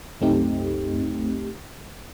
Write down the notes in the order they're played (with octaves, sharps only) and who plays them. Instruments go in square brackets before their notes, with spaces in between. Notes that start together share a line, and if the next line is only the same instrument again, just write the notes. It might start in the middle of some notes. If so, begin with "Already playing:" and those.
[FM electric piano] C2 F#2 A3 C4 D#4 G4